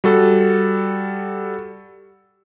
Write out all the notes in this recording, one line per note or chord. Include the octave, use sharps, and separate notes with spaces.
G3 F#4 A4